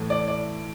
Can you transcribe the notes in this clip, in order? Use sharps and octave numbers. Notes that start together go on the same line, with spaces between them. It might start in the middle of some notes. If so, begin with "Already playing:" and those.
Already playing: A2 E3 A3
D5
D5